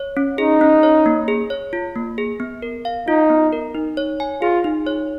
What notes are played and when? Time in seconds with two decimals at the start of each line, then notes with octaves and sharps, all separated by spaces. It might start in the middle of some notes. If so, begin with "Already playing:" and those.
Already playing: C#5
0.17 C#4
0.38 D#4 G#4
0.61 C#4
0.83 C#5
1.06 A#3
1.28 G#4
1.50 C#5
1.73 F4
1.96 A#3
2.18 G#4
2.40 B3
2.62 A#4
2.85 F5
3.08 D#4 F4
3.30 B3
3.52 A#4
3.75 D#4
3.97 C#5
4.20 G#5
4.42 F4 G#4
4.64 D#4
4.87 C#5